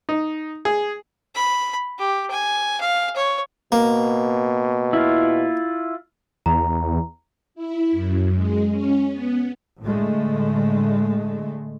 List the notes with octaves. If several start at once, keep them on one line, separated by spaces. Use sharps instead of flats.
D#4
G#4
B5
G4
G#5
F5
C#5
B2 A#3
E4 F4
E2 A#5
E4
F#2
G#3
C#4
B3
A2 D3 G#3 A3